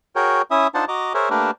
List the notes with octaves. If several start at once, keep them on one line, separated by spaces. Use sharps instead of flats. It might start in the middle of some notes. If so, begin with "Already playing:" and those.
F#4 G#4 A#4 C#5 G5
C#4 E4 E5 D#6
D4 D#4 F4 C5 F#5 A5
F#4 D#5 A#5 D6
G#4 A#4 C5 C#5 E5
A3 A#3 D4 G4 A#4 B4